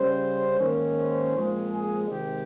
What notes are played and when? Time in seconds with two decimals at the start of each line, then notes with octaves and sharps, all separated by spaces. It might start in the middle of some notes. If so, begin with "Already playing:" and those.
Already playing: C#3 G3 C#4 C5
0.59 G#2 D#3 A#3 C#4
0.96 C5
1.34 A#2 F3 G#3 C4
1.71 G#4
2.08 C3 D#3 G#3 C4 G4